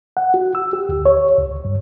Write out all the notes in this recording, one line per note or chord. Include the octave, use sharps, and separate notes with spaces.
F#5
F#4
E6
G4
D2
C#5
C#2
G2